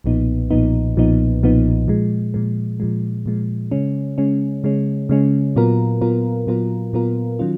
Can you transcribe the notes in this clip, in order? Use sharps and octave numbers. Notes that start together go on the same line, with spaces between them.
B1 A#2 F3 B3 D#4
B1 A#2 F3 B3 D#4
B1 A#2 F3 B3 D#4
B1 A#2 F3 B3 D#4
A#2 F3 G#3
A#2 F3 G#3
A#2 F3 G#3
A#2 F3 G#3
C#3 G#3 C#4
C#3 G#3 C#4
C#3 G#3 C#4
C#3 G#3 C#4
A#2 F#3 B3 F4 A#4
A#2 F#3 B3 F4 A#4
A#2 F#3 B3 F4 A#4
A#2 F#3 B3 F4 A#4
D#3 F#3 C#4 F4